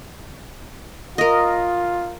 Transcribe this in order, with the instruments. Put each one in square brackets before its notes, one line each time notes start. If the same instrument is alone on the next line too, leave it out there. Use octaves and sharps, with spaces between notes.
[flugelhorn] F4 [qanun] A#4 D#5